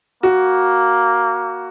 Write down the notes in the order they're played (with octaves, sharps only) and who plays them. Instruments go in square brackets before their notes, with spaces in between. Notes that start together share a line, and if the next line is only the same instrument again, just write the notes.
[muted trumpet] A#3 [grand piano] F#4